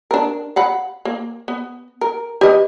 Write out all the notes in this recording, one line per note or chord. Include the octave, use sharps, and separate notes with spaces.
D4 A#4
F5 F#5 B5
A#3
B3
A#4
G4 B4 D#5